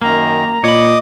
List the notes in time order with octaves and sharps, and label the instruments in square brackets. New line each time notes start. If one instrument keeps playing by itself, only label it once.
[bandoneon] F#2 D#3 [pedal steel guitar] A#3 [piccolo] A#5
[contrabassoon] A#2 [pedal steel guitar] C#5 B5 [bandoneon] D#5 D6 D#6